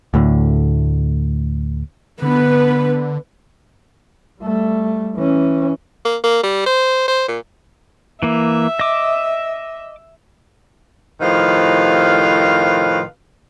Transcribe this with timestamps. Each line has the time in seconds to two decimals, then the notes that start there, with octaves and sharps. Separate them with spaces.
0.14 D2 A2 D3
2.22 D3 B3 B4
4.41 G3 A3
5.15 E3 C#4
6.05 A#3
6.24 A#3
6.43 G3
6.66 C5
7.08 C5
7.28 A#2
8.23 E3 A#3 E5
8.79 D#5 D6
11.21 A2 C3 D#3 F3 B4 F5